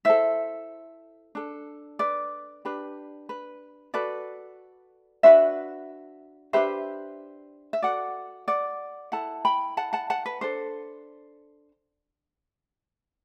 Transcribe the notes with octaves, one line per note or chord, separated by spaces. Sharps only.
E4 A4 C5 E5
D4 A4
B4 D5
D4 G4 B4
B4
F#4 A4 B4 D5
D4 F#4 B4 C5 E5
D4 G4 B4 C5 E5
E5
F#4 A4 D5 F#5
D5 F#5
E4 A4 F#5 A5
G5 B5
F#5 A5
F#5 A5
F#5 A5
B4
D4 A4 C5